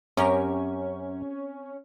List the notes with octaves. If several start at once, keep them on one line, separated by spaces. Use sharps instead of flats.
F#2 C4 C#4 G4 A#4 C#5